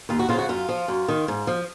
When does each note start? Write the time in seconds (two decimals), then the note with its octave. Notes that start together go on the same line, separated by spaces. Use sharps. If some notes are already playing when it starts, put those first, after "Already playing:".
0.09 D#2 F4
0.19 F#4
0.29 C#3 F4
0.33 F3
0.38 F#4
0.49 F#2 F4
0.69 F3
0.88 F#2
1.08 D#3
1.28 G#2
1.47 F3